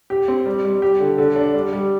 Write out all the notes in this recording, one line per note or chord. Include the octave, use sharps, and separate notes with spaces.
G4
C4
G3
G3
G4
D3
D3
D4
G3
G3